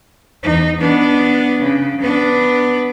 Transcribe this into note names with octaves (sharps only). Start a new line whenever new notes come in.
E2 D#4
B3 D4
C#3
B3 D4